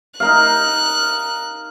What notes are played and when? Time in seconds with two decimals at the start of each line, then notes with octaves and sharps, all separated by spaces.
0.20 D#4 A#4 F5 F#6